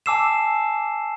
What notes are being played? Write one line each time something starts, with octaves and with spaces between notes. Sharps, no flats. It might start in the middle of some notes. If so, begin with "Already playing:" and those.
G#5 A5 D6 E6 C7 E7